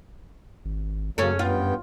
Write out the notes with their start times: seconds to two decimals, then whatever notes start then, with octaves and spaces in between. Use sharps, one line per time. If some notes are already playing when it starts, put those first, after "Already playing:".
0.65 G#1
1.18 F#2 C#3 F#3 A#3 C#4 G#4 A4
1.39 G2 B3 F4 G5